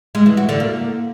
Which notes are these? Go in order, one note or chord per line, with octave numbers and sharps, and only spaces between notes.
G#3
E3
F#4
D3
A#3